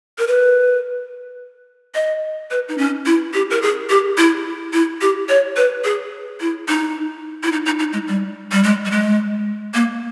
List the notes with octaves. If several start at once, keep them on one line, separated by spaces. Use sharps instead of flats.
A#4
B4
D#5
B4
D#4
C#4
E4
G4
A#4
G#4
G4
E4
E4
G4
C#5
B4
G#4
E4
D#4
E4
D#4
D#4
D#4
G#3
G3
G3
G#3
G3
G#3
A#3